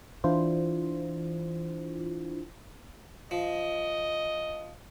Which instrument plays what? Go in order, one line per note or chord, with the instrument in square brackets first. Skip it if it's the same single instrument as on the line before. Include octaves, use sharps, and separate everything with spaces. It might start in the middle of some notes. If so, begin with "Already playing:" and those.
[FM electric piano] E3 D4 E4 F4 C5
[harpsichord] F3 [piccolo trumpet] D#5